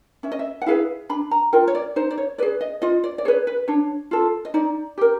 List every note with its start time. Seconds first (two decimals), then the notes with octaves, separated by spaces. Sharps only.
0.23 C#4 E5
0.32 D#5
0.39 E5
0.62 F#5
0.66 E4 G#4 B4 F5
1.09 D4 B5
1.31 A#5
1.53 F4 A#4 G5
1.68 C#5
1.75 D5
1.96 D#4 C5
2.11 D5
2.18 C#5
2.38 G#4 B4 D5
2.61 D#5
2.82 F4 D#5
3.04 D5
3.18 D5
3.25 G#4 B4 C#5
3.47 B4
3.68 D4 C#5
4.11 F4 A4
4.45 D#5
4.54 D#4 D5
4.98 G4 A#4